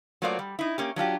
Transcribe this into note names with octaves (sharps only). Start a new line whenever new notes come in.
F#3 A3 A#3 F4 C5 D5
G3
D#4 E4
A#3 C#4 G4
F#3 D4 F4 G4